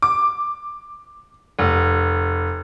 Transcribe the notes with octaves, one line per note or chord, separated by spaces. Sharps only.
D6
F1